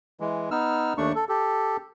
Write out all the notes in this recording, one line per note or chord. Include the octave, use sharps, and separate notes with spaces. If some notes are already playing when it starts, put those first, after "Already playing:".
E3 G#3
B3 D#4 E6 F6
D#2 A3 D4 C#6
A4
G4 A4